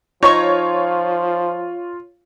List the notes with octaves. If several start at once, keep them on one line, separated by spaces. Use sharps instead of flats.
F3 D#4 F4 C#5 A#5 C#6